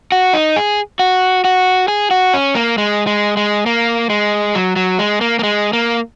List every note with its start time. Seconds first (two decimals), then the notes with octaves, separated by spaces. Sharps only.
0.12 F#4
0.34 D#4
0.56 G#4
0.99 F#4
1.45 F#4
1.88 G#4
2.11 F#4
2.34 C#4
2.55 A#3
2.78 G#3
3.07 G#3
3.37 G#3
3.66 A#3
4.10 G#3
4.55 F#3
4.76 F#3
4.99 G#3
5.21 A#3
5.39 A#3
5.43 G#3
5.73 A#3